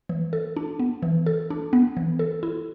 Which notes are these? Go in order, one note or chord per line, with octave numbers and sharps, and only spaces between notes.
E3
A4
D4
B3
E3
A4
D4
B3
E3
A4
E4